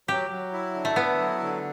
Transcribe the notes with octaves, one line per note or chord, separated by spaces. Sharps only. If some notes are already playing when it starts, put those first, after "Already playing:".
F#3 G4
F#3
E4
D3
A3
B3 E4
F#3
D3